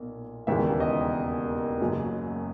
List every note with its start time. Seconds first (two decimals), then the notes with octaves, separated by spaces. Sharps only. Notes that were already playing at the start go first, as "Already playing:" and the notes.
Already playing: B1 A#2 A#3
0.47 E1 D#2 C#3 E3 E5
0.80 D#5
1.81 F#1 F#2 C#3 F#3